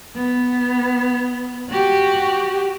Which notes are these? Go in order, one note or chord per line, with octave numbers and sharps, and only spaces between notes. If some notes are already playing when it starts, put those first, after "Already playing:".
B3
F#4 G4